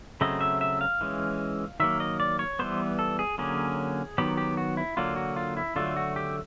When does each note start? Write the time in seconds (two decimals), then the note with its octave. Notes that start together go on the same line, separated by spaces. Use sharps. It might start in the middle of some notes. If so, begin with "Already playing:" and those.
0.21 C#3 F#3 A3 C4 D#5
0.41 E5
0.61 E5
0.81 F5
1.01 E3 G#3 C#4
1.80 D#3 F#3 A#3 E5
2.00 D#5
2.20 D5
2.39 C#5
2.59 E3 G3 B3 C5
2.99 A4
3.19 G#4
3.38 D3 F#3 A#3 C#4 G#4
4.18 D#3 F#3 B3 G4
4.37 G4
4.57 F#4
4.77 E4
4.97 D3 F#3 A#3 F4
5.16 F#4
5.36 F4
5.57 E4
5.76 D3 F#3 A3 F4
5.96 F#4
6.16 G4